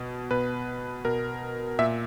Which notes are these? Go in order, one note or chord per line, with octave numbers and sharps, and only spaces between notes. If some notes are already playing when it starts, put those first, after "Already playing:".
Already playing: B2
B2 B4
B2 A#4
A#2 E5